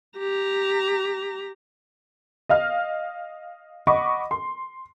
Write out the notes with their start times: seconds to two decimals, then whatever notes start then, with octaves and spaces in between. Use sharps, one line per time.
0.18 G4 A#5
2.49 D#5 F5 F6
3.87 D#5 F#5 B5 C#6 D6
4.31 C6